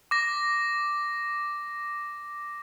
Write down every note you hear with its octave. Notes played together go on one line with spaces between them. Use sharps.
D6 A#6